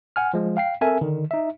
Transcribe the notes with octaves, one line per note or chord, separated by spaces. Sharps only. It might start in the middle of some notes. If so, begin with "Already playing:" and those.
F#5 G#5 F6
F3 G#3
F5 G5 C7
C4 A4 A#4 E5 G#5
D3 D#3
D#4 E5